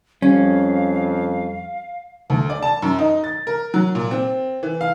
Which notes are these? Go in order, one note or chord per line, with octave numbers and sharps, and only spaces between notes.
F2 G3 C#4 F5
D2
D5
A5
F#2
D#4
A6
A#4
F#3
A#2
C4
E3
F5